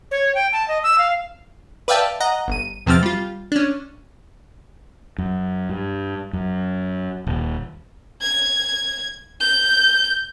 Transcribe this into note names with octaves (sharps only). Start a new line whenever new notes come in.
C#5
G5
A5
D#5
E6
F5
B4 D5 E5 F5 G5 A5
D#5 F#5 A#5
G1 D#7
E2 C3 F3 C4 F6 A6
G3 F4
C#4 D4
F#2
G2
F#2
D#1
G#6
G6